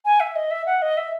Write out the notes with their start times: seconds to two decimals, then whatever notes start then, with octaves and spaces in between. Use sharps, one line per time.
0.05 G#5
0.20 E5
0.36 D#5
0.51 E5
0.66 F#5
0.82 D#5
0.97 E5